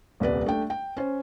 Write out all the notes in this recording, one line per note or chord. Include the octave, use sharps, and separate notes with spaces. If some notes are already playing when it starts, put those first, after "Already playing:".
D#1 C2 B4 D5
A3 D4 G5
G5
C#4 C5